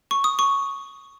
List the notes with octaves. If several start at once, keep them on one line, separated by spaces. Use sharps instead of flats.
C#6
D#6
C#6